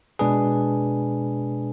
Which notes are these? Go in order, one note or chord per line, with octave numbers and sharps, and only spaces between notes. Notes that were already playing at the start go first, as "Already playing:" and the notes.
B2 G#3 D4 G#4 B4